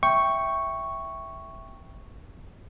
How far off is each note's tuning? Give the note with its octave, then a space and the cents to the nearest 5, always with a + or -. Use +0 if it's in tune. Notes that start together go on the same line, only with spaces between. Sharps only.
E5 +0 G5 +0 C#6 +0